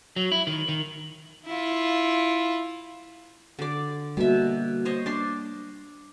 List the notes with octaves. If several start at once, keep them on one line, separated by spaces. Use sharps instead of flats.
F#3
E4
D#3
D#3
E4 F4
D3 D5
B2 G3 A#3 E5
C5 C#5 D#5
D4 C6